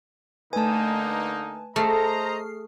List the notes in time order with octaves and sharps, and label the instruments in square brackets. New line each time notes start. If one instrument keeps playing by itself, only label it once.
[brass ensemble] D3 A#3 D#4 [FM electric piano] A3 B4 [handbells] G#5 A5
[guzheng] A3 [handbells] G#4 [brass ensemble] C5 D#5 A#5 [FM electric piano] F6 C7